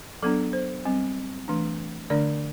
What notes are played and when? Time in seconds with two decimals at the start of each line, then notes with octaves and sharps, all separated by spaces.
0.23 F#3 B3 D4 A4
0.53 C5
0.85 G3 C4
1.48 E3 A3 D4
2.10 D3 A3 D4 D5